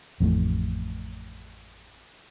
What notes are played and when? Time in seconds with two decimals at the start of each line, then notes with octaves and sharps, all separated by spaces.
0.20 A1 F2 A2 A3